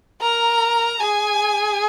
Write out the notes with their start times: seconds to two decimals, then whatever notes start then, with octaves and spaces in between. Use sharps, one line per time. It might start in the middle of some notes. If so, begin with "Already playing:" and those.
0.21 A#4 A#5
1.00 G#4 G#5